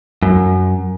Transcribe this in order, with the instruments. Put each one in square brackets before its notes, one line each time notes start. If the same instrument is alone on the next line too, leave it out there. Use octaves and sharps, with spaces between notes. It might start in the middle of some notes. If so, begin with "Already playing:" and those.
[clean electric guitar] F#2